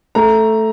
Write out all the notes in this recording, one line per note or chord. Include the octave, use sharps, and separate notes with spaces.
A3 A#5